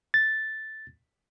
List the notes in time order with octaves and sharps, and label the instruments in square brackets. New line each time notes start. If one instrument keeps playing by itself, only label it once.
[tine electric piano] A6